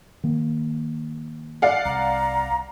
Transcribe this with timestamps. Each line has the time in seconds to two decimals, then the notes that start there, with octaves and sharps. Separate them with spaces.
0.24 D#3 A#3
1.62 D5 F5 F#5
1.85 C2 A#5